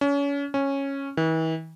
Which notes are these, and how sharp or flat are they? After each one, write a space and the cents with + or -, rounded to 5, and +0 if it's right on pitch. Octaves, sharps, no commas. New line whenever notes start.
C#4 +30
C#4 -10
E3 -40